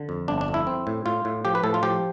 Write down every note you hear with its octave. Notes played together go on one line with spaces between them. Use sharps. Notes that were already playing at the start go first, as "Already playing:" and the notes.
Already playing: D3
F2
G1 D4
D4
F2
E4
C4
A2
A2 F4
A2
F3 G4
B4
A2 A4
F4
F3 G4